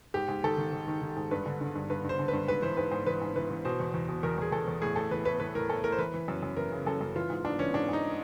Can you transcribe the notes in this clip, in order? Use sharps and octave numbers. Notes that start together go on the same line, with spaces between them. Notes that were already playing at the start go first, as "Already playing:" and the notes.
G#2 G4
G#2
D#3 A4
D#3
D#3
D#3
D#3
G#2
G2 B4
D3
D3
G2
G2 B4
G2
C5
D3
B4
G2
G#2 B4
E3 C5
G#2 B4
G#2 C5
E3 B4
G#2
E3 B4
E3
B2 C5
E2
E2
B2
E2 A#4
E2 G#4
E2 A4
E2
A2 G#4
A2 A4
E3 B4
A2 B4
E3 B4
A2 A#4
A2 A4
A2 A#4
C5
E3 B4
E3
F#2
F#2
E3 A#4
C#3
F#2 A4
F#2
E3 F4
G#2
G#2 D4
E3 C#4
G#2 D4
G#2 D#4